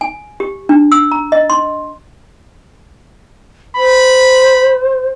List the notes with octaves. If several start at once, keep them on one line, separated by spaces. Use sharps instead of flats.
G#5
G4
D4
E6
A#5
D#5
C6
C5 B5